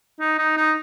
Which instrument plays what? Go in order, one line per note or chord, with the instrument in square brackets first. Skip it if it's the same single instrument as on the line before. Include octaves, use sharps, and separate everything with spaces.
[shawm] D#4
D#4
D#4